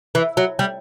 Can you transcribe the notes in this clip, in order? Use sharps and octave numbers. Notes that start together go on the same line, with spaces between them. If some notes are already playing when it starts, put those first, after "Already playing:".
E3
F#3
G3